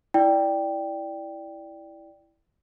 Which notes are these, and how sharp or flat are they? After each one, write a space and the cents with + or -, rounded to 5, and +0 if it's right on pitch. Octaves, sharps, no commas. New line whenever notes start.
E4 +0 D5 +0 G5 +0